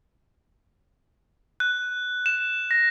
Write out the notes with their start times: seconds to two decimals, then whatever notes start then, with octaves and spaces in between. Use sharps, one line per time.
1.60 F#6
2.26 E7
2.71 A#6